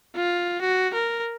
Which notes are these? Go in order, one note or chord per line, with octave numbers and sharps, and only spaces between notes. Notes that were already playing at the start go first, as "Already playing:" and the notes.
F4
F#4
A#4